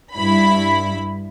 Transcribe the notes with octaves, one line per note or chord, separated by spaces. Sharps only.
G2 E4 B5